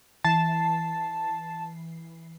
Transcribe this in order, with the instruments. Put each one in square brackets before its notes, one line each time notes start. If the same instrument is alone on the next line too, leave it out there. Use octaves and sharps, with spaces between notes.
[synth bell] E3 C7 [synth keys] A5